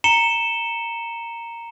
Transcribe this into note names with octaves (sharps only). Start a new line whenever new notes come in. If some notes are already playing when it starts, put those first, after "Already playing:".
A#5 C#7 E7 G7